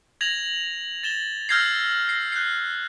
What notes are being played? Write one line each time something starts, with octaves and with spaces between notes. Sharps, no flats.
G#6 A#6 F7 F#7
A6 E7 G7
E6 F6 G6 G#6 A#6 C7
A#6 C7
F#6 G6 C7